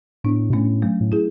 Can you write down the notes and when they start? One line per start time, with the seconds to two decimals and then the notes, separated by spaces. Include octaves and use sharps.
0.24 A2 B3 D4
0.50 B2
0.53 A2 A3 C#4
0.82 F#3 A3
1.01 A2
1.12 E4 G#4